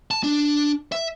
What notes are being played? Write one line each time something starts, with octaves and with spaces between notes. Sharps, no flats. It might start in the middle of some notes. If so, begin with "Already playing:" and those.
A5
D4
E5